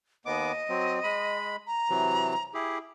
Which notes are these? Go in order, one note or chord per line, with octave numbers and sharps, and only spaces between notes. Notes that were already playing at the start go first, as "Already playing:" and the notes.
D#2 B3 D#5 D6
F#3 C4
G#3 B5
A#5
C3 E3 F#3
E4 G4 G#4